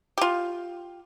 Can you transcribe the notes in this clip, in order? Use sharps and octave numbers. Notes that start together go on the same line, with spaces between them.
F4 G4